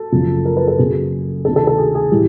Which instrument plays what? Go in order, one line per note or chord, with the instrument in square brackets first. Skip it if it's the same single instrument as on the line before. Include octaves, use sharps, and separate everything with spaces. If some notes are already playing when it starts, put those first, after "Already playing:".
Already playing: [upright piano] A4
F#1 F#2 C#3 F3
A#4
B4
A4
F#2 C#3 F#3 G#4
D2 C3 D#3 A4
A4
A4
G#4
G#4
A2 E3 G3 G4